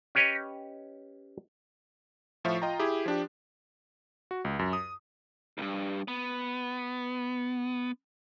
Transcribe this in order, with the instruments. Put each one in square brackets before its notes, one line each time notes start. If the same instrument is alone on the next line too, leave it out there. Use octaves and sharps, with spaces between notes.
[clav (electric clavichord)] C#4 G4 B4 C#5 D#5
[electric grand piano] A2 F3 F4 E5 C#6
F4 D#5 G5 A#5
E4 G4 G#4
F3 D4 G4
F#4
C#2
F#2
D#6
[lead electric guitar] B1 G2
B3